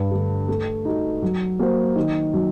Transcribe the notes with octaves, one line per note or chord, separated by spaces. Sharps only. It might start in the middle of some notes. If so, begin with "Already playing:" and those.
Already playing: G2
D3 A3
A3
D#4 F#4
F#3
A#3 F#4 C5
D#3
F#3